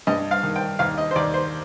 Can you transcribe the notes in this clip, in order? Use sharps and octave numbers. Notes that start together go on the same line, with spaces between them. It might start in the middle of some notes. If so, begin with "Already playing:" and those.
G2 D#5
F5
D#3
G5
D#2 F5
D#5
C5
D#2 D5
C5